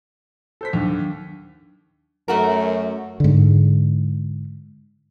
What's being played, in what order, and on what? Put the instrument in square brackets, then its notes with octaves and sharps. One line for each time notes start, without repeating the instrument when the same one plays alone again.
[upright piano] A4 C5 B6
[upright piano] D#2 [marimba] F#3 D4
[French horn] F#2 [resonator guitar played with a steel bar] A3 F#4 A#4
[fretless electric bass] G#2 D3